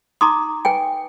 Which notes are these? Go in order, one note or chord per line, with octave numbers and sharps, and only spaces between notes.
D#4 A#5 C6 D6 D#6
B4 G5 G#5